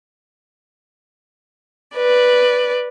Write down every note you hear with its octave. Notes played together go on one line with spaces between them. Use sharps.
B4 D5